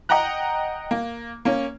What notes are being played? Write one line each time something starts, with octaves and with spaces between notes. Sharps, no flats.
D#5 F#5 G5 A#5 F#6
A#3
A#3 C#4